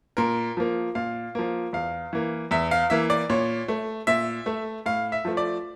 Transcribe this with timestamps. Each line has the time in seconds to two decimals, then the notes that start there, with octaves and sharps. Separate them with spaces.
0.17 A#2 A#4
0.57 F3 A#3
0.95 A#2 F5
1.35 F3 A#3
1.73 E2 F5
2.13 E3 A#3
2.51 E2 E5
2.71 F5
2.90 E3 A#3 E5
3.10 D5
3.30 A#2 C#5
3.68 A3
4.07 A#2 E5
4.46 A3
4.86 A2 F5
5.12 E5
5.25 F3 A3
5.37 D5